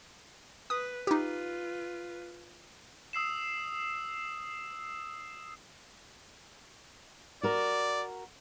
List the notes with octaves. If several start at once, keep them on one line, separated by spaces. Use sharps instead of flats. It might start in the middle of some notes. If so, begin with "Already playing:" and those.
B4 D#6
D#4 F4 G4 B4
D#6 E6 C7 E7
F#4 A#4 D5